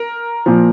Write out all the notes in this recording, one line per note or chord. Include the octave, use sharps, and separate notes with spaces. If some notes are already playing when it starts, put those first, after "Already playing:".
Already playing: A#4
A#2 F3